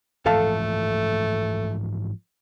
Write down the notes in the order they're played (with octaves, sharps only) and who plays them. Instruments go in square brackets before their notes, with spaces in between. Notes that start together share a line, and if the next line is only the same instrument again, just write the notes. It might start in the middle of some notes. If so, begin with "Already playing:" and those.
[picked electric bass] G#2 E3 F3 [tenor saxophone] A3 [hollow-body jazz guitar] A4 F5 A5